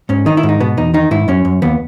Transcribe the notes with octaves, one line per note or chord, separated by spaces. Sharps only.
G#2 C#4
D#3 D#4
E4
G#2
D#4
B2 B3
E2 D#4
D#3 D#4
G#2 E4
F#2 C#4
F#2
D#2 B3